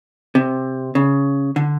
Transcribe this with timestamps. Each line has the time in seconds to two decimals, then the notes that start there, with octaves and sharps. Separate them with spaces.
0.35 C3
0.95 C#3
1.56 D3